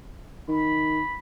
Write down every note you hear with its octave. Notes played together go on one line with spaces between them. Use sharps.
D#3 B5